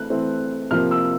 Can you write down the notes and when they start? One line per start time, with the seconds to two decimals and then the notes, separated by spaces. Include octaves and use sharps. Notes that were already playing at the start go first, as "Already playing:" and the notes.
Already playing: E3 A3 C4 F#6
0.10 E3 A3 C4
0.71 C3 F3 A#3 F6
0.91 E6